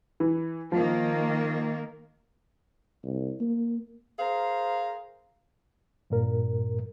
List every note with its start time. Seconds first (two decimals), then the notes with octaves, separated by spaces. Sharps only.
0.20 E3
0.72 D#3 F3 A#3
3.04 C2
3.41 A#3
4.19 G#4 A#4 C5 F5
6.10 G2 A#2 A#4